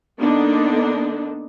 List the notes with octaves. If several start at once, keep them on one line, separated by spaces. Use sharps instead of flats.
D3 A#3 B3 D4 D#4